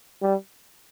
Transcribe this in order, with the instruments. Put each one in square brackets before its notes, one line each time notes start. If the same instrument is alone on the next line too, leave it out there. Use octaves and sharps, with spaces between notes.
[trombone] G3